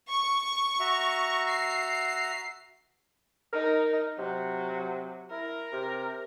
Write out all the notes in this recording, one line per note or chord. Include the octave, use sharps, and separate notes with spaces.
C#6
F#4 E5 A#5
C7
D#4 A#4
C3 F#3
E4 A#4
C3